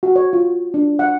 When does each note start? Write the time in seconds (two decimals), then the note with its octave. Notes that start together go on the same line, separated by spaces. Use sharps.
0.03 F#4
0.16 C#5
0.33 F4
0.74 D4
0.99 F#5